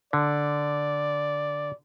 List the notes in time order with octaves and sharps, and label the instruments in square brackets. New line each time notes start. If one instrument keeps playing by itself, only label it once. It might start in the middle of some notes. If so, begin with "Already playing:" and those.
[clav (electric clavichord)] D3 [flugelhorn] D5